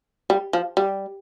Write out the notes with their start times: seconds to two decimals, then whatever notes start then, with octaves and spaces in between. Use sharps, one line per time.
0.30 G3
0.53 F3
0.77 G3